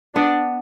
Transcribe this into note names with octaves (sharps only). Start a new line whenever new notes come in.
B3 D4